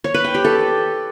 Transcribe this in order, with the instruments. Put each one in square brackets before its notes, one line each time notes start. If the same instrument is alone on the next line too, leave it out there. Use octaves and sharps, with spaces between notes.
[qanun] C#5
B4
G5
G4
A4